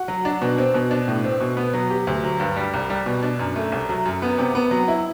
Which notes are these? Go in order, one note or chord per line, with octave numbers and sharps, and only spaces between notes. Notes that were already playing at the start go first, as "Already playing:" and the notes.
Already playing: F#4
F#3
D4
B2
C4
B2
D4
A2
C4
B2
B3
F#3
G4
D2
F#3
G2
G3
C2
G3
B2
D4
F#2
A3
C2
F#3
F#2
B3
C3
B3
F#3
E4